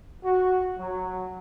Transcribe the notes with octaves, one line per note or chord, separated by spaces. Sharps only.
F#4
F#3